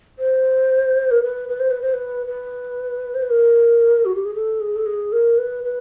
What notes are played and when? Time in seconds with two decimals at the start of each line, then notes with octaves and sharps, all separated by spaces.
0.19 C5
1.11 A#4
1.23 B4
1.49 B4
1.60 C5
1.71 B4
1.82 C5
1.93 B4
2.27 B4
3.14 C5
3.22 B4
3.30 A#4
4.05 F#4
4.15 G4
4.25 G#4
4.34 A4
4.60 G#4
4.76 A4
4.86 G#4
5.12 A#4
5.38 B4
5.64 B4